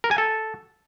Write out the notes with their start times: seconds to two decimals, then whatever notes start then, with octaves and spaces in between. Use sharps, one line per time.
0.04 A#4
0.11 G#5
0.18 A4